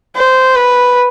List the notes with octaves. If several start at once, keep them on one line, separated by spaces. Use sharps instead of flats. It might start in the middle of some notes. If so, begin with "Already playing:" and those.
C5
B4